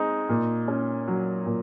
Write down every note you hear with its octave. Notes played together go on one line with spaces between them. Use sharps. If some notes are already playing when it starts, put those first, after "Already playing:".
Already playing: G#3 C4 D#4
A#2
C#4
F#3
A#2